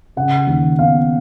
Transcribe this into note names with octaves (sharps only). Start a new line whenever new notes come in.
C#3 F#5
D#2
B3 F5